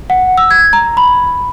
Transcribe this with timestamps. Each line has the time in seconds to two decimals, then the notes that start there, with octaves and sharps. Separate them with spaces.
0.10 F#5
0.38 E6
0.51 G#6
0.73 A#5
0.97 B5